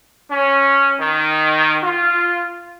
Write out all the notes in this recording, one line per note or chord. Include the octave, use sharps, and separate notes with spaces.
C#4
D#3
F4